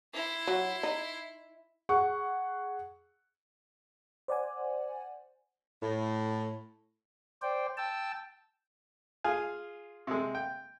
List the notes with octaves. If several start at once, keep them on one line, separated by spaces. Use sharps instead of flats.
E4 C6
F#3
D#4
G#4 F#5 C#6
C5 D5 F#5 G#5
A2
C5 D5 G5
G5 A5 E6
F4 G#4 F5 G#5
C3 G#3
G5